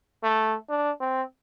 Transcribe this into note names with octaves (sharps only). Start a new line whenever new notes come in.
A3
D4
C4